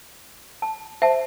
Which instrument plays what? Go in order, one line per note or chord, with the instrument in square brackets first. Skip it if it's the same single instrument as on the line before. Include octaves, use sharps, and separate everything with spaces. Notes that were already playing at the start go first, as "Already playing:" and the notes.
[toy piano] A5
[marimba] C5 [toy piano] E5 A5